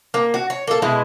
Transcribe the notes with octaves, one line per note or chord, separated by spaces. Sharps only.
A#3
F#4
C#5
A#3 A4
B2 G#3 E4